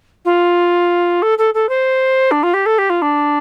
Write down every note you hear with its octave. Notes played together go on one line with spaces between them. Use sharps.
F4
A4
A4
A4
C5
D4
F4
G4
A4
G4
F4
D4